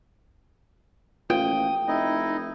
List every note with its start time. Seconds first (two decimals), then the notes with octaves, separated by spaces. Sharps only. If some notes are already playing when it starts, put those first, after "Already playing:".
1.30 A1 F4 G5 D#6
1.88 F1 D#4 E4 D#5